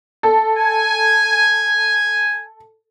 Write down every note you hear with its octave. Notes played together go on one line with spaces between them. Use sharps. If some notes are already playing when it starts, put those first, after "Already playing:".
A4
G#5